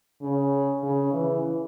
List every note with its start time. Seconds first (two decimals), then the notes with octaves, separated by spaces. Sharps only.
0.22 C#3
0.83 C#3
1.13 E3